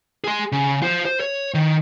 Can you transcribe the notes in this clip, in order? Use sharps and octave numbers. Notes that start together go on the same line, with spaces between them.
G#4 C6
C#3
F4 C5
C5
C#5
D#3